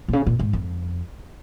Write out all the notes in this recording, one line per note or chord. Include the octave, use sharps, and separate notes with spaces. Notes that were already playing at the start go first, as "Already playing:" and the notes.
A#2
C#3
A#2
G#2
F2